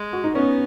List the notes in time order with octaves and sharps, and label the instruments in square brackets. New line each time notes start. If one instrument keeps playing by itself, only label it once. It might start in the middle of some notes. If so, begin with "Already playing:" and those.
Already playing: [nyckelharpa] G#3
[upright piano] F#4
D#4
[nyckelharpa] B3 [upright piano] C#4